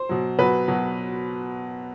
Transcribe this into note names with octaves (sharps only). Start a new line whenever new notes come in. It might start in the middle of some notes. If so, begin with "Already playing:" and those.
Already playing: C5
B2 F#3
B2 F#3 B4
B2 F#3